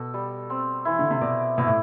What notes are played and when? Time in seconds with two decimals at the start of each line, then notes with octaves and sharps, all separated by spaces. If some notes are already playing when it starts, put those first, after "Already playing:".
Already playing: B2 A4
0.14 G3
0.50 C4
0.85 E3 E4
0.99 D3
1.11 C3
1.21 B2 D5
1.58 B2 E4
1.67 A2